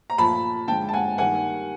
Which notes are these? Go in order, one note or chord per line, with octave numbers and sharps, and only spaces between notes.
A#5
A#2 F3 A3 A5 B5
D3 F3 G#3 G5 A5
A5
F#5 G#5
D#3 G3 A#3 F#5 G#5